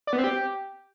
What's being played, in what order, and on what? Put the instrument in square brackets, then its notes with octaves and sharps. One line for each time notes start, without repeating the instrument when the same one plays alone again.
[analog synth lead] D5
B3
C4
G4